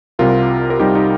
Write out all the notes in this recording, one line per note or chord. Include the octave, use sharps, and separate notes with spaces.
C2 C3 G3 F4 A#4
A#4
C2 C3 G3 D#4 G4
D#4